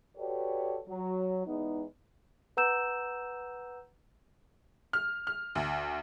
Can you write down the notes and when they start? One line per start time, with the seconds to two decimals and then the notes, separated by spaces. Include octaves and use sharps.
0.17 F#4 G4 A4 B4 C#5 D5
0.87 F#3
1.46 E2 G#3 B3 D#4
2.57 B4 F#5 A#5 E6 G6 E7
4.93 F6
5.27 F6
5.55 D2